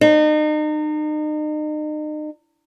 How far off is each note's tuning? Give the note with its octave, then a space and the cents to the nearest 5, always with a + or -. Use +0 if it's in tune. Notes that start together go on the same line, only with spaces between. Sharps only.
D#4 -35